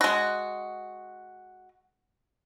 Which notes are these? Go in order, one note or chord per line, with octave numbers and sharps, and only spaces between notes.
G#3 F#4